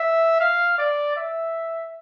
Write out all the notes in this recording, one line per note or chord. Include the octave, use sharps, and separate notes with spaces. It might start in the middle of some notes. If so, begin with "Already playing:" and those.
Already playing: E5
F5
D5
E5